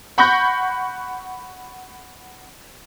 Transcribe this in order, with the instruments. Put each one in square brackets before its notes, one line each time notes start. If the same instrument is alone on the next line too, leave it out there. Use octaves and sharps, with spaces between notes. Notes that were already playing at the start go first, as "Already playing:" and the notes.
[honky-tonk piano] F#5 B5 C#6 F#6 G6 A#6